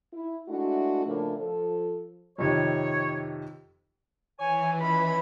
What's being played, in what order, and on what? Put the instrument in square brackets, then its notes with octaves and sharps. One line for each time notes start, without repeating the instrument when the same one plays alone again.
[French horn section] E4
G#3 A3 D4 E4 F#4
A2 C#3 F3 A3 A#3 D4
F3 A4
[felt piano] F2 C3 D#3 [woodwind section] C#5
[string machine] E3 [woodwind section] C#5 G#5
[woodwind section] C#2 C#4 B5